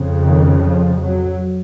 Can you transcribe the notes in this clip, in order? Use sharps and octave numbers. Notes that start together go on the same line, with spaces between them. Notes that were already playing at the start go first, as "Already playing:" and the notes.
Already playing: F2 C#3
D#3
F3
F#3